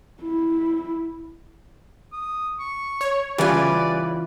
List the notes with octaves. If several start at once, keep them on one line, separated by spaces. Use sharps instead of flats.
E4
D#6
C#6
C#5
C#3 E3 G3 F4 B4 D5 G#5